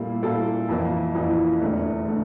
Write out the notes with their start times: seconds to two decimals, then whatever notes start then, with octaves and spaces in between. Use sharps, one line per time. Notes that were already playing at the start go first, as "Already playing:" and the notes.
Already playing: A#2 G3 A#3 E4 A4
0.22 A#2 G3 A#3 E4 A4
0.69 F2 E3 A#3 E4
1.15 F2 E3 A#3 E4
1.62 E1 E2 D3 A3
2.08 D3 A3